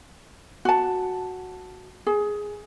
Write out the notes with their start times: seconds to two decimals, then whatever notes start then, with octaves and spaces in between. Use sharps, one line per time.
0.65 F#4 A5
2.07 G#4